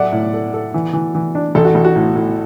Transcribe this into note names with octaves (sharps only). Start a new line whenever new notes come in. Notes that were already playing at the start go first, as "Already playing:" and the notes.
Already playing: F#3 A4 D5 E5 F#5
A2
A4
A4
E3
E3
E3
D4
A1 A4
F#4
A1
F#4
A2
A2